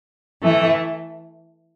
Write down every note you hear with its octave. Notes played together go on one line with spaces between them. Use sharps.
E3 A3